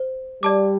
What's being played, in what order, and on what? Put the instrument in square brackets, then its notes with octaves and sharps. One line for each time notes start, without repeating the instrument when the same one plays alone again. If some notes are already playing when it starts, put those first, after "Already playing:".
Already playing: [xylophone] C5
[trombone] G3 [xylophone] D5 A5 D6